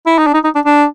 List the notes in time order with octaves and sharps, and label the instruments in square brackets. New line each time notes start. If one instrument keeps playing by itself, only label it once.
[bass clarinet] E4
D#4
D4
D#4
D#4
D4
D4